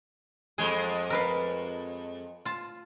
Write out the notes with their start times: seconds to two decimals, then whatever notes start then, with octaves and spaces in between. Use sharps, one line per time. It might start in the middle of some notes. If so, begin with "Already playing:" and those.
0.58 F2 G#3 G#4
1.10 A#4 B4 F5
2.45 F4 A5